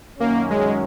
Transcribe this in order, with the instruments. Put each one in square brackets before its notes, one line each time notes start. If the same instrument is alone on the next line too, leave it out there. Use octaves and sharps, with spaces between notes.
[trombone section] F#2 D#3 F#3 C#4 [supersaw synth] A#3
[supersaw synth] G#3